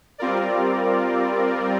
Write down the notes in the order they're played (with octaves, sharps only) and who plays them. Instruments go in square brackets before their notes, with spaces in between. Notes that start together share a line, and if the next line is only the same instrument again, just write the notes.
[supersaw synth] G3 C4 F4 A#4 D5